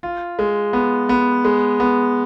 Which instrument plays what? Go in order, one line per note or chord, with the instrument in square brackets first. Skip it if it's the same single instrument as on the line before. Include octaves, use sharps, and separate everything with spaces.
[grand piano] F4
G#3
B3
B3
G#3
B3